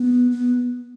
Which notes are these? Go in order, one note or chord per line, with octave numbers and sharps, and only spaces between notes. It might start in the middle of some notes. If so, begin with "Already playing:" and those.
Already playing: B3
B3